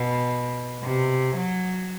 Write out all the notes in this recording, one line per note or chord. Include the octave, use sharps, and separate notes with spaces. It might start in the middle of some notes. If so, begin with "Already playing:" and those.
Already playing: B2
C3
F#3